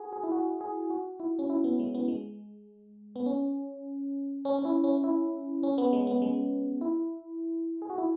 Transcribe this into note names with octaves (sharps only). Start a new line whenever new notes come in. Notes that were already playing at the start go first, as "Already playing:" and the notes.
Already playing: F#4 G#4
G#4
E4
F#4
G#4
F#4
E4
C#4
E4
B3
G#3
B3
G#3
B3
C#4
C#4
C#4
E4
C#4
E4
C#4
B3
G#3
B3
G#3
E4
G#4
F#4
E4